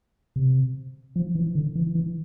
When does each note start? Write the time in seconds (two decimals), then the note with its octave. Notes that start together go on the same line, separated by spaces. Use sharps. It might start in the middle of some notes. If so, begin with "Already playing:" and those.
0.36 C3
1.16 F3
1.35 E3
1.55 D3
1.75 E3
1.95 E3